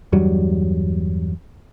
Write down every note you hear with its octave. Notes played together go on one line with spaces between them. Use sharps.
E2 G2 F#3 G3